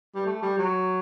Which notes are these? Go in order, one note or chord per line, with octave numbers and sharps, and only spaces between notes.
G3
A3
G3
F#3